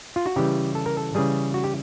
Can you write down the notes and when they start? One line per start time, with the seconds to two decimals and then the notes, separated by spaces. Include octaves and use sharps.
0.16 F4
0.26 F#4
0.36 C#3 E3 G3 G4
0.75 A4
0.86 A#4
0.97 A4
1.15 C#3 E3 G3 G#4
1.54 F#4
1.64 G4